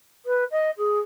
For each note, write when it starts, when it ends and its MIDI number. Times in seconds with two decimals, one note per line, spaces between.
0.25 0.44 71
0.50 0.70 75
0.77 0.98 68